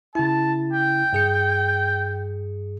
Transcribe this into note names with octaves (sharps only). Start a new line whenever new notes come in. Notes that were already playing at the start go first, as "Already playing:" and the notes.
C#3 E4 A5
G5
G2 G#4 C#7